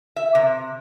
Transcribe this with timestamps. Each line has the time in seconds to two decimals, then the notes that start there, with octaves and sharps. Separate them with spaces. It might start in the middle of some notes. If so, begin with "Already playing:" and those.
0.16 E5
0.35 C3